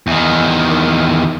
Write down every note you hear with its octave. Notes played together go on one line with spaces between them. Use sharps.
E2 D#3